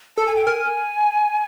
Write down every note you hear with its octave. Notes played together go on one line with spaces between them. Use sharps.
A4 A5
G#5
G5
A#4 G#5